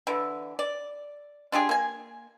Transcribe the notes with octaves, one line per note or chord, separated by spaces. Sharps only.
D3 E3
D5
D4 F4 G4 G#4
A#3 G#5